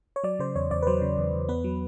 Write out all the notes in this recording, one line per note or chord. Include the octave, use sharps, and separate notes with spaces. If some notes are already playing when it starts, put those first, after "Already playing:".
C#5
F#3 D5
C#3 C5
E2 C#5
E2 D5
B4
F#3 C5
C#3
E2
E2
B3 B4
F#3